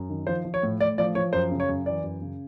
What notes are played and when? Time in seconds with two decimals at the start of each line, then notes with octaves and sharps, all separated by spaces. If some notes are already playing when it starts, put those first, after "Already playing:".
Already playing: F#2
0.10 D#3
0.27 F3 C5
0.45 F3
0.54 C#5
0.63 A2
0.80 A2 D5
0.98 F3 D5
1.15 F3 C#5
1.33 F#2 C5
1.51 C#3
1.60 C#5
1.69 F#2
1.86 E3 D5
2.03 F#2
2.21 C#3